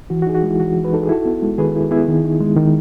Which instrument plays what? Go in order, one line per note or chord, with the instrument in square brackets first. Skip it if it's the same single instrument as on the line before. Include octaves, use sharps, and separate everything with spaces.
[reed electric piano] E3 F#4
F#4
D#4 G#4
F#4
G#3 E4
E3 F#4
E3
B4
D#4 A4
G#4
E4 F#4 A4
B3
G#3
D#3 G#4 B4
E4
B3 E4 G#4
D#3
D#4
G#3
D#3